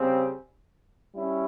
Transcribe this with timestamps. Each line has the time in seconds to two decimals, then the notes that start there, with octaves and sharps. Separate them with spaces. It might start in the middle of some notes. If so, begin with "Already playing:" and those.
Already playing: C#3 G3 C4
1.14 G3 C#4 E4